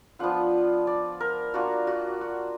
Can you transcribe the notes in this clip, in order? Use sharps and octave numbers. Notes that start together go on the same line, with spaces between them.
F3 B3 D4 F4 F#5
D5
A#4
A#3 D4 F4 F#4
F#4
F#4